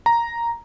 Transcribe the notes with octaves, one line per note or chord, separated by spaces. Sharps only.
A#5